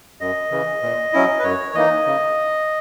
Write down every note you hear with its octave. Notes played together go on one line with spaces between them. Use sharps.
F#2 D#5
C#3 E3
A#2
F#3 C#4 E4
B4
F#2 C#5
E3 A#3 D#4 D#5
C#3